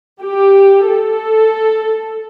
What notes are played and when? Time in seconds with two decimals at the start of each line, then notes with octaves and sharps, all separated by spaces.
0.22 G4
0.87 A4